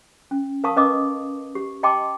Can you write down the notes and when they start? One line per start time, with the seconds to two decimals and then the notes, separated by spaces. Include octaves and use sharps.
0.31 C#4
0.64 A#4 F5 A5 C#6 D#6
0.76 C#4 B4 D#5 D6 D#6
1.55 G4
1.83 D#5 G5 A5 C6 D6